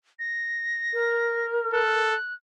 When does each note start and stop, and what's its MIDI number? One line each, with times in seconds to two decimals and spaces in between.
0.19 1.46 94
0.93 2.05 70
1.73 2.15 69
1.73 2.34 90